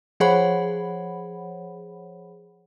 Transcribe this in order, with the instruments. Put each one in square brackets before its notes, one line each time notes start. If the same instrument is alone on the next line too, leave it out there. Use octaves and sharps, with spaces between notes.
[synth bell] F3 G#4 C5 C#5 F#5 B5